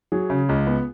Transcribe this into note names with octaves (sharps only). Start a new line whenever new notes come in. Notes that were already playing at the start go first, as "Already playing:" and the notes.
F#3 G#4
C#3
C#2
B3